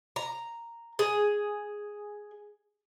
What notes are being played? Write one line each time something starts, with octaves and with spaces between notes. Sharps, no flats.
A#5
G#4